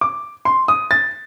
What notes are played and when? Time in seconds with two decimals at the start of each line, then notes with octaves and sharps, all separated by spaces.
0.01 D6
0.45 C6
0.68 D#6
0.91 A6